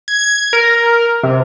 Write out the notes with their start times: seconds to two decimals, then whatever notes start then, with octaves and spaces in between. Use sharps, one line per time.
0.08 G#6
0.53 A#4
1.23 C3